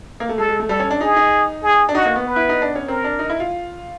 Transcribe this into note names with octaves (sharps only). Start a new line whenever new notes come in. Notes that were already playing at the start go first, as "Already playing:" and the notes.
A#3
A3
G#3 A4
G#3
A3
G3 A4
C#4
D4
D#4 G#4
D#4
G#4
D4
D#4 F#4
A#3
B3
B4
E4
D#4
D4
C#4
C4 A#4
D4
D#4
E4
F4